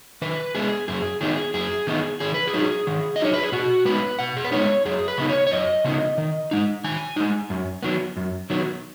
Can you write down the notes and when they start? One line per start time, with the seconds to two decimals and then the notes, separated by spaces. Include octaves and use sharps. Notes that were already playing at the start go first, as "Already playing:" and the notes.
0.22 D#3 B4
0.55 G#3 B3 G#4
0.88 F#2 G#4
1.21 D#3 B3 D#4 G#4
1.54 F#2 G#4
1.87 D#3 B3 D#4
2.20 D#3 G#4
2.34 B4
2.47 G#4
2.54 F#3 D#4
2.87 D#3
3.16 D#5
3.20 F#3 D#4 C#5
3.33 B4
3.43 G#4
3.52 B2 F#4
3.85 G#3 B3 D#4 B4
4.19 B2 F#5
4.37 G#4
4.44 B4
4.52 G#3 B3 D#4 C#5
4.85 F#2 G#4
5.08 B4
5.18 C#3 B3 D#4
5.29 C#5
5.47 C#5
5.51 F#2 D#5
5.84 C#3 B3 D#4
6.18 D#3
6.51 G#3 D#4
6.84 D#3 G#5
7.16 G#3 D#4
7.50 F#2
7.83 D#3 F#3 B3
8.16 F#2
8.50 D#3 F#3 B3